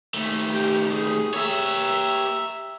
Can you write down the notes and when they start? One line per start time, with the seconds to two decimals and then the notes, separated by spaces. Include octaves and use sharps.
0.14 D#2 A3
0.52 G4
0.91 G#4
1.34 G4 C#5 E5 A#5